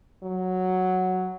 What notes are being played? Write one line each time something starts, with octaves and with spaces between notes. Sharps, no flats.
F#3